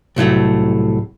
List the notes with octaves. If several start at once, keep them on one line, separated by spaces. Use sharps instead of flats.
C2 A2 F#3 A3